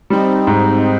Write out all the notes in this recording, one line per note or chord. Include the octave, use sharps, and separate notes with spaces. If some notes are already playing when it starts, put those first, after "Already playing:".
G3 C4 D#4
G#2